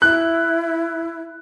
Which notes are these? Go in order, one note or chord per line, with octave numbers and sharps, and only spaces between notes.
E4 F#6